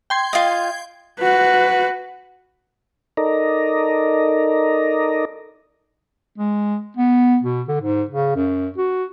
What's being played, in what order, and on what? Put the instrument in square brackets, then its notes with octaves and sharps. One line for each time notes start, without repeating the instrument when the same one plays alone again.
[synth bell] G5 C6 G#6
[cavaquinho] F4 D#5
[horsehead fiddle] F#4 B4
[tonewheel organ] D#4 A4 A#4 D5 D#5 A#5
[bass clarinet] G#3
B3
B2
D3
G#2
C#3
F#2
F#4